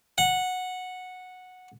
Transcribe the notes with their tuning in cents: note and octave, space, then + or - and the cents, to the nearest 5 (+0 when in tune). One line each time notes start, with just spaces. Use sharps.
F#5 -10